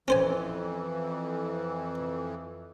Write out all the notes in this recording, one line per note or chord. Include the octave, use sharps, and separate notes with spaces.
F2 E3 C#4 C5 G#5